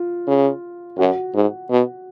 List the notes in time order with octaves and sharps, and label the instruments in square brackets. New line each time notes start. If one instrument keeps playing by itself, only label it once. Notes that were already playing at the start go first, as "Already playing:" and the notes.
Already playing: [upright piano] F4
[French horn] C#3
[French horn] F#2 [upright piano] F#4
[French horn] G#2
B2